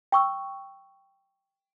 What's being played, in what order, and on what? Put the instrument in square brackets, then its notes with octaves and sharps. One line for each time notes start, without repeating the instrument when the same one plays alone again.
[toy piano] G5 C#6 E6